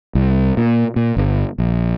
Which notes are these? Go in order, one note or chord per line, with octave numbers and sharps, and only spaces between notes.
C2
A#2
A#2
G1
A#1